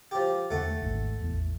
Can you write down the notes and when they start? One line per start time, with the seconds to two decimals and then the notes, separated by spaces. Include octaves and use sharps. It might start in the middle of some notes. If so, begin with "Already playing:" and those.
0.11 F3 G4
0.51 E2 D3 A3 F#5
0.82 G#1 D#2
1.22 A1 E2